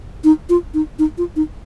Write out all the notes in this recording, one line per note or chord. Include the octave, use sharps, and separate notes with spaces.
D#4
F4
D#4
D#4
F4
D#4